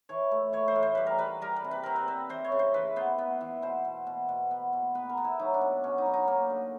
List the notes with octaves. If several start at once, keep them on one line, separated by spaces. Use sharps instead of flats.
E3 C#5
A3
E3 C#5
C5
A2
C5
G3 B4
A#4
G3 B4
G3 A#4
B4
C3
B4
C4 A#4
B4
C4
E3 C5
C#5
C#3
C5
E3 B4
B3 C5
B3
E3
B2 C5
B2
B2
B2
B3
B2
B3 B4
A#4
B3
E4
F#3 D#4
D4
B2
B2 C#4
D#4
F#3
D#4
A#3
D3